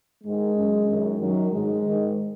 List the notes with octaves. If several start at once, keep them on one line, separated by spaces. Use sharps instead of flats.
G#2 D#3 G#3
F#2 C#3
F#2 D#3
F#2 D#3 F#3
G#2 D#3 G#3
G#2 D#3